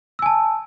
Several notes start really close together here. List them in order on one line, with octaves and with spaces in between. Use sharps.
E6 G#5 A5